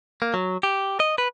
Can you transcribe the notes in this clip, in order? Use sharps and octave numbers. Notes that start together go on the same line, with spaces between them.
A#3
F#3
G4
D#5
B4